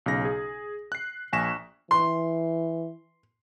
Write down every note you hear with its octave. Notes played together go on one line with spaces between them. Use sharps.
B1 C#3 A#6
G#4
F#6 C7
A#1 G#5 C#6 A#6 B6 E7
E3 C6